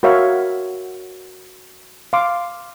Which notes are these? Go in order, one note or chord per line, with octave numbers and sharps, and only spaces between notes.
F#4 A#4 C#5 E5 F5
F5 C6 D6